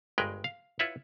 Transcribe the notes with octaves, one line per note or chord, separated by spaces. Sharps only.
G1 G2 G#3 A#4 B4 G5
F5
E4 F4 B4 C#5 E5 F#5